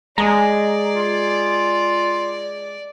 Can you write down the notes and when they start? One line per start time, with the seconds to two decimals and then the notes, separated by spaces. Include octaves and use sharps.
0.18 G#3 G#4 D5 A#5
0.95 F4